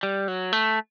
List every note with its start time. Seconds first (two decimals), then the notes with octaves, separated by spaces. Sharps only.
0.03 G3
0.28 F#3
0.53 A3